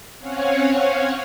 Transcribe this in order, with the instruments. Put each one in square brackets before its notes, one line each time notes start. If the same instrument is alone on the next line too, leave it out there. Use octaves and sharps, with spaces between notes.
[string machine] C4 C#4 C#5 F5 F#5 G#5